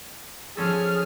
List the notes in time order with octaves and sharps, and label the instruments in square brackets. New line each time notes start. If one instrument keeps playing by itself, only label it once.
[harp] F3 C#4 A4 [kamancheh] G#4 F6